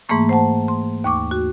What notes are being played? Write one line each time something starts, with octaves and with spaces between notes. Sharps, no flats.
G#2 E3 A3 A#3 C#6
C5 F#5 A5
C6
D#2 C#6 D6
F#4